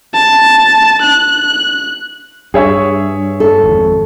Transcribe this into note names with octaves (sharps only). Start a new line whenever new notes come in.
A5
F#6
G2 G#4 C#5 E5
A4
G#1 F2